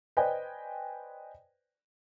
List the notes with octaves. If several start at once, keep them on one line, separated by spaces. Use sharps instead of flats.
B4 C5 D5 D#5 G5 G#5